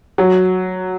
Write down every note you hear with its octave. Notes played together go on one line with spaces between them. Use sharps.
F#3